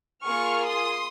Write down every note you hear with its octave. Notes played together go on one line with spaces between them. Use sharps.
A#3 F4 G#4 C#6 F6
C6 D#6